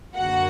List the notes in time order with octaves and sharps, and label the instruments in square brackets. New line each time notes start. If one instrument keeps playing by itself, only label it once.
[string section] F#2 D3 A#3 F#4 F#5